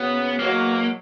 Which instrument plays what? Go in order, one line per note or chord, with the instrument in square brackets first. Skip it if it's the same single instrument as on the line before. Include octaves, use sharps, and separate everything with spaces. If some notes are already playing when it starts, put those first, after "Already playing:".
Already playing: [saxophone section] F#2 C#3 F#3 C#4 [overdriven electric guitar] B3
[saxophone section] E2 B2 F#3 [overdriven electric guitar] A#3